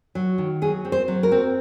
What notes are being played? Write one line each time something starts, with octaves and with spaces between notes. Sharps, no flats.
F#3
D#3
F#3 G#4
C4
C5
F#3
A#4
C4